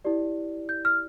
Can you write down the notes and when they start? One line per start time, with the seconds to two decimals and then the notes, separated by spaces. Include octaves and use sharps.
0.05 E4 G4 D5
0.69 G6
0.85 F6